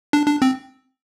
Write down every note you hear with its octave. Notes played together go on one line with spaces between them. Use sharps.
D4
D4
C4